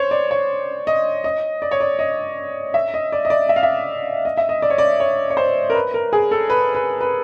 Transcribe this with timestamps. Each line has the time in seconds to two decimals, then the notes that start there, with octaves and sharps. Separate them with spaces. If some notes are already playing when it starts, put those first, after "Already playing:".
Already playing: C5 C#5
0.11 D5
0.31 C#5
0.87 D#5
1.24 D#5
1.62 D5
1.71 C#5
1.80 D5
1.99 D#5
2.74 E5
2.94 D#5
3.12 D5
3.25 D#5
3.30 D5
3.49 E5
3.56 F5
3.63 E5
4.25 D#5
4.37 E5
4.49 D#5
4.62 D5
4.70 C#5
4.78 D5
5.00 C#5
5.30 C#5
5.37 C5
5.70 A#4
5.74 B4
5.94 A#4
6.13 G#4
6.31 A4
6.50 B4
6.75 B4
7.01 B4